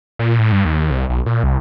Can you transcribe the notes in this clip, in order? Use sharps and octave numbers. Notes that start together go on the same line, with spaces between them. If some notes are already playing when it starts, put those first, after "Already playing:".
A#2
A2
G2
D#2
C2
B1
A#2
C2